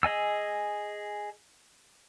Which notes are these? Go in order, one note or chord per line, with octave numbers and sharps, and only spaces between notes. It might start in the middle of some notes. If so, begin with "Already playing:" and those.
G#4 D#5 G#5 E6